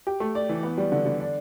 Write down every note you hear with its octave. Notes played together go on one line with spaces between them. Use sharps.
G4
A3
D5
E3
B3
G3
D3
D3
D4